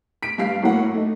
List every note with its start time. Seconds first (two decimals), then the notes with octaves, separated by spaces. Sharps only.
0.23 B6 D7
0.38 G2 F5 B6 C7
0.62 A2 F#3 A#3 F#5
0.94 A3 D#4